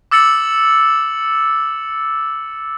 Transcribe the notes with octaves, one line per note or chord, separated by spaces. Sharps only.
D6 E6 A6 C#7 F#7